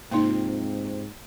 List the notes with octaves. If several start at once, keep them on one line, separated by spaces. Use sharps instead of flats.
G#2 C3 A#3 C4 D#4 F4